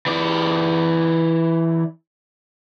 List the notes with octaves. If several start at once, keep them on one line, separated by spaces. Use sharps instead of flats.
E3 D5